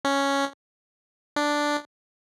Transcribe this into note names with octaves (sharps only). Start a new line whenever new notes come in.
C#4
D4